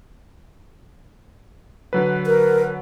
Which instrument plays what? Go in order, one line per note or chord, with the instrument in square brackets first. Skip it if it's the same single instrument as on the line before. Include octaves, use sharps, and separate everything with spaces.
[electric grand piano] D3 F#3 B4
[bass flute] A#4